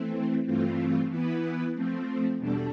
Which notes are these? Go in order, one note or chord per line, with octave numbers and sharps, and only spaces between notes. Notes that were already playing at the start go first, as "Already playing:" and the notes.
Already playing: E3 A3 C4
G2 E3 A3 C4 F4
E3 B3 E4 B4
F3 A3 C4
E2 B2 G3 D4 A4